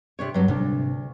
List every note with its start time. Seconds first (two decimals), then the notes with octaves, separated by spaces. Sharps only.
0.19 C3 D4 C#5
0.34 G2 F#3 C4
0.48 D2 G#2 C3 D4